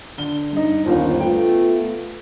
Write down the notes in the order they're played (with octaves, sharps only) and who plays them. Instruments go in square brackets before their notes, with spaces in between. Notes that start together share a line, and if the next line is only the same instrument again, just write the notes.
[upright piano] D3 G7
G2 D#4
[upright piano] G1 D#2 F4 [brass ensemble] A#3 C#4 C5
[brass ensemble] A3 B3 F4 [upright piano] G5